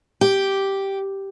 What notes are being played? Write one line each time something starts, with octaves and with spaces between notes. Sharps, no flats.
G4